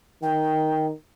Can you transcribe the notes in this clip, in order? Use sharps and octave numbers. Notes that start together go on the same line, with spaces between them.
D#3 G5